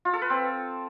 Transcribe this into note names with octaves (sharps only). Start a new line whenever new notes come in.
F4
A4
B4
C4